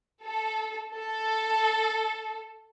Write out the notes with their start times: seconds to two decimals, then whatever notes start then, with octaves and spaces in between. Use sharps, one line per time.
0.24 A4
0.96 A4